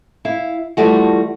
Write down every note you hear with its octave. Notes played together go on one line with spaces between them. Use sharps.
E4 F5
E3 F3 G3 A3 F#4